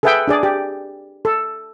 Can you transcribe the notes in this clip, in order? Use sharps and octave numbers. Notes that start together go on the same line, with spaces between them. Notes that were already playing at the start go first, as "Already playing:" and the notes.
G#4 A4 B4 E5 F#5 G5
D4 G#4 D5
G4
A4